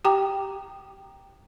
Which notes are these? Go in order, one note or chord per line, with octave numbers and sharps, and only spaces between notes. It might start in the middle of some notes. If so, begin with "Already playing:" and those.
G4 G5 A#5 D6